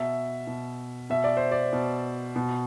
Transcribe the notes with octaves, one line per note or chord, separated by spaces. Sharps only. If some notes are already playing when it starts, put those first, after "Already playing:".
Already playing: B2 E5
B2
B2 E5
D5
C5
D5
B2
B2